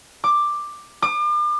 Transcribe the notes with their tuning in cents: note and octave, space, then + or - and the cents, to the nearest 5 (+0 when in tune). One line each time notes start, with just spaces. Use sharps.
D6 +10
D6 +40